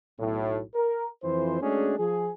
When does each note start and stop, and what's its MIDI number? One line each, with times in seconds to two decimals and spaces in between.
0.19 0.61 35
0.19 0.61 45
0.74 1.05 70
1.24 1.61 41
1.24 1.61 52
1.24 1.61 72
1.61 1.95 56
1.61 1.95 57
1.61 1.95 61
1.61 1.95 62
1.61 1.95 66
1.61 1.95 68
1.98 2.30 53
1.98 2.30 68